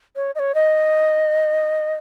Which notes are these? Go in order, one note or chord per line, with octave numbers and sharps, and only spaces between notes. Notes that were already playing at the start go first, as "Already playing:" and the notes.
C#5
D#5
C#5
D#5